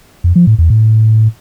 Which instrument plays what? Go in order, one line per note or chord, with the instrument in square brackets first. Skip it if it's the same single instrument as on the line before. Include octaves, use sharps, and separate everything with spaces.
[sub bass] F2
F3
A2
E2
A2